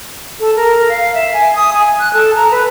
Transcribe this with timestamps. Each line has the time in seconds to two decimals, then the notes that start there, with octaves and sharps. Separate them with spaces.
0.40 A4
0.56 A#4
0.89 F5
1.14 E5
1.33 G#5
1.56 D#6
1.73 G#5
2.00 F#6
2.14 A4
2.36 A#5
2.51 B4